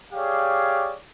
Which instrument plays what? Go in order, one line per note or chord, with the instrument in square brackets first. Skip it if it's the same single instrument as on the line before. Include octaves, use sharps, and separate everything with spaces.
[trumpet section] G4 G#4 C#5 D5 F5